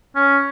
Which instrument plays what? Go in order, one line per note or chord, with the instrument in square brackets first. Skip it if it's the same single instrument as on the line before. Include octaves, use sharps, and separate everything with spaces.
[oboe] C#4